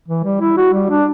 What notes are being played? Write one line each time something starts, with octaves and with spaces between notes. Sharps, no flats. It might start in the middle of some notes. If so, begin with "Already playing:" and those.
E3
G3
E4
F#4
G3
D4